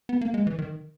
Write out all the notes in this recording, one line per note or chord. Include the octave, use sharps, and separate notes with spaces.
B3
A#3
G#3
E3
D#3